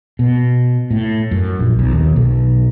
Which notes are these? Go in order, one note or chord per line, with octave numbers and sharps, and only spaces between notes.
B2
A2
F#2
A#1
B1
D#2
B1